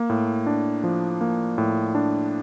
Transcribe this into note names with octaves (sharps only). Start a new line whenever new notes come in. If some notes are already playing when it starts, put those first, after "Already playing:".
Already playing: A#3
A2
D4
F3
A#3
A2
D4